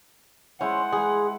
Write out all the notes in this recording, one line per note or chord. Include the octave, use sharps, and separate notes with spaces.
G#3 C#4 E4 C5 F#5
G#3 G#4 B4